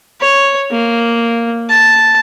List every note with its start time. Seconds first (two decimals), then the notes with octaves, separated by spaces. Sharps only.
0.21 C#5
0.71 A#3
1.69 A5